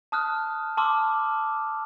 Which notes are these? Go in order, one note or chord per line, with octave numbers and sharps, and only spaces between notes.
A5 D#6 F6 F#6
A5 C6 D6 E6 F6